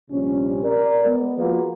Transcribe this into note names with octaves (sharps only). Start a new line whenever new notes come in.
A#1 C3 G3 C#4
A#4 D5
G#3 B3
F3 A#3 F4 F#4 G#4 B4